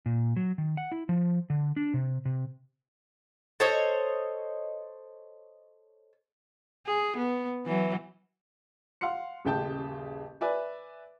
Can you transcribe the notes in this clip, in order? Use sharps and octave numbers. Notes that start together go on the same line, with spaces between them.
A#2
F#3
D#3
F#5
E4
F3
D3
D4
C3
C3
A4 C5 C#5 D#5
G#4
B3
E3 F#3
F5 F#5 C6 C#7
D#1 A1 C#3 G5 A5 G6
B4 D5 E5 G#5